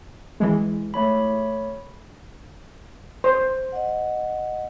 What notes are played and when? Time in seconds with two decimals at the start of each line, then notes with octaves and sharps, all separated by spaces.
0.40 E3 G#3
0.94 A3 C#5 B5
3.24 C5
3.72 D#5 F#5